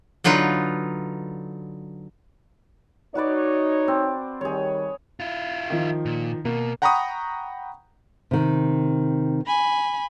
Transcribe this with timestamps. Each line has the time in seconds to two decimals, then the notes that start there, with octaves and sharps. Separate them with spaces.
0.24 D3 F#3 D#4 F4 B4
3.15 D#4 F#4 B4 C#5 D5
3.88 C4
4.41 D#3 G3 G#4 C#5
5.20 E4 F4
5.70 D#3 F3
6.05 A#2
6.45 B2 A#3
6.82 F#5 G5 A#5 B5 C#6 D#6
8.31 C3 D#3
9.46 G#5 B5